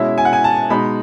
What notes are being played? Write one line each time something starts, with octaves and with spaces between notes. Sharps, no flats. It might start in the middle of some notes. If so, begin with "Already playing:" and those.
Already playing: B2 G#3 C#4 E4 E5
G#5
F#5
G#5
A5
B2 G#3 D#4 B5